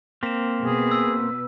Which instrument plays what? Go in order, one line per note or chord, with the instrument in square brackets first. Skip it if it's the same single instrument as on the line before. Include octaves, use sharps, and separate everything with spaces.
[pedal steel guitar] A#3 C4 [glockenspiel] B6 E7
[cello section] B2 B4 [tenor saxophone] G#4
[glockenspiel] E6